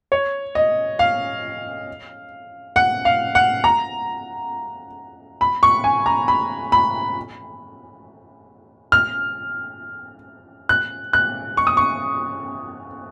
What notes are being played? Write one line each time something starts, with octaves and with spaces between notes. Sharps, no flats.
C#5
D#5
F5
F#5
F5
F#5
A#5
B5
C#6
G#5
A#5
B5
B5
F6
F#6
F#6
C#6
D#6
C#6